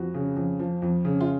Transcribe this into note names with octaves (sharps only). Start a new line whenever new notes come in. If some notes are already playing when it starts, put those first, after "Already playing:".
Already playing: F2 F#4
C#3
F2
F3
F2
C#3
F4